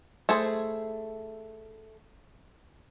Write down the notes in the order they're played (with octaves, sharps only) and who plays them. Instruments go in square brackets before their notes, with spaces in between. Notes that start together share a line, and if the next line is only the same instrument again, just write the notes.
[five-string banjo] A3 E4 G#4 C5